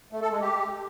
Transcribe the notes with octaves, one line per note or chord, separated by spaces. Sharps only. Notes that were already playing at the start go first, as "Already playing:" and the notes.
A3
A4
G#3
G4